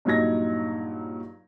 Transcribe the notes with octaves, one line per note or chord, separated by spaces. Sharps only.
G2 A#2 F#3 D#4 G#6 A#6